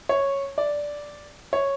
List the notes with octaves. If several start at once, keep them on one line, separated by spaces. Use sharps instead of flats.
C#5
D5
C#5